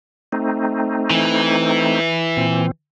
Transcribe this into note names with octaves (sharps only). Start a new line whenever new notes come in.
A3 C4 D#4
E3
A#2 C4